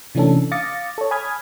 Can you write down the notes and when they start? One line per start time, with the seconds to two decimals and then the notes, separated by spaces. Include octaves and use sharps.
0.15 C3 E3 A3 C#4 D4 A4
0.51 F5 D6 D#6 A6 A#6 C#7
0.98 A4 C#5
1.11 G#5 B5 D#6 F6 G#6